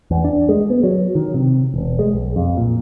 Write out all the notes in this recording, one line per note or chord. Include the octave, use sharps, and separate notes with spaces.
E2
D4
G#3
B3
F#3
D#3
C3
E1
G#3
B1
F2
A#2